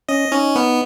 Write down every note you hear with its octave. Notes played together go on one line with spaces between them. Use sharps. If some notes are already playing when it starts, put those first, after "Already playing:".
C#4 D#5
C#4 D#4
B3